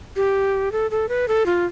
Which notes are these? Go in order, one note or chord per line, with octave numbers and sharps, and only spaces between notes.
G4
A4
A4
B4
A4
F4